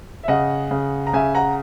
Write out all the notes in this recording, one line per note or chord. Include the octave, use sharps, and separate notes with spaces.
E5
C#3 D#5 F#5
C#3
A#5
C#3 E5 G#5
F#5 A#5